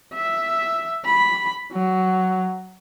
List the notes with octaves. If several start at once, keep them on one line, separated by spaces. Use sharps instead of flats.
E5
B5
F#3